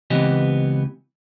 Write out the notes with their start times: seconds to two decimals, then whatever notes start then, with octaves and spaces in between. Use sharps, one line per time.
0.10 C#2 E3 B3 C4 G4 D#5